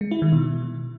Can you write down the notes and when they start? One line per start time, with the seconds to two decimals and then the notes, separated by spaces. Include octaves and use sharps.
0.01 G#3
0.11 E4
0.22 D#3
0.32 B2